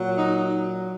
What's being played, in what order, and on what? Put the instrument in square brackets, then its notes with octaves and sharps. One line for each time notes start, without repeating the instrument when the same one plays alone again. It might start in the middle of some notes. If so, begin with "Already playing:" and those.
Already playing: [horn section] A#2 F#3
D#4